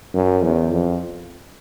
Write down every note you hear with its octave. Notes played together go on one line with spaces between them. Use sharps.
F#2
E2
F2